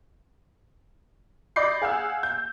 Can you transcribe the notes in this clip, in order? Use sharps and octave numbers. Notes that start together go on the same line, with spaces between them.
D5 D#5 B5 D6 G6 C7
G#4 F5 F#5 E6
G6